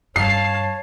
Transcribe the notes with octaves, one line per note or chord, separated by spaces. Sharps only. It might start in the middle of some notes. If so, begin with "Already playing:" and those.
G2 C#5 F5 A5 C7